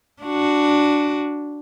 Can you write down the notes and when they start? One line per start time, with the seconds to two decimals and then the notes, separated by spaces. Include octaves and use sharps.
0.23 D4 F#4